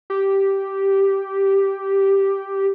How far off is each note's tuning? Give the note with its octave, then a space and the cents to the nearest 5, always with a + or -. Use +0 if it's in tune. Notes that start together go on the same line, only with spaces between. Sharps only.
G4 -5